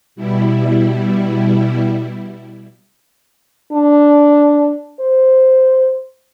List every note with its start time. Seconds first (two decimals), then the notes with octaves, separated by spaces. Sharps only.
0.16 B2 G3 E4
3.73 D4
5.01 C5